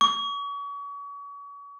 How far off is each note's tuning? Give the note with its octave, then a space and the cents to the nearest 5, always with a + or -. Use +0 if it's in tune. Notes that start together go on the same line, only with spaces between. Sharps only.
C#6 +40